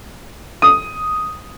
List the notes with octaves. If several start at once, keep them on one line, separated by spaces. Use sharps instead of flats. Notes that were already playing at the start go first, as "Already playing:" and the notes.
D#6